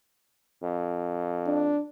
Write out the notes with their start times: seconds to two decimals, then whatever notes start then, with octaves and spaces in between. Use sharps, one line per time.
0.63 F2
1.47 D4